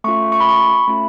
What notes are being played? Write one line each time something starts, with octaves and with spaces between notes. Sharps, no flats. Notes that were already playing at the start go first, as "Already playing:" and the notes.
A3 C#4 F4 C#6
C#6
B5
C#6
B5
A3 C#4 F4